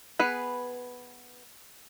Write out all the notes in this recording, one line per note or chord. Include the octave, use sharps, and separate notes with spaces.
B3 G#4 B4